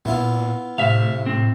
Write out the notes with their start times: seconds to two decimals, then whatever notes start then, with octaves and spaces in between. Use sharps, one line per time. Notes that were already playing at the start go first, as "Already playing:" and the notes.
0.05 A#2 B3 E4 F4
0.78 A2 C3 E5 F5
1.26 C4